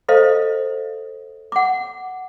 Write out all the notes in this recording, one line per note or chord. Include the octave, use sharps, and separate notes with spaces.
A4 C5 D#5 F5
F#5 D6